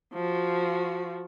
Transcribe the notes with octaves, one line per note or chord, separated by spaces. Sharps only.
F3 F#4